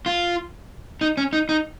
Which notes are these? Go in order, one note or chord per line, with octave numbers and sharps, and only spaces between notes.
F4
D#4
C#4
D#4
D#4